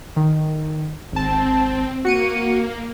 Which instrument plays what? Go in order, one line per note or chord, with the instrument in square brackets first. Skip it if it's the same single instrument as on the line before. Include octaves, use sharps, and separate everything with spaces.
[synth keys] D#3
[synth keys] G#1 A5 [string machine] C4
[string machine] A#3 [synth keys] F#4 C#7 D#7